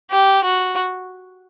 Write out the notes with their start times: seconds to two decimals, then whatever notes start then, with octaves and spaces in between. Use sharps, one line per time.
0.11 G4
0.44 F#4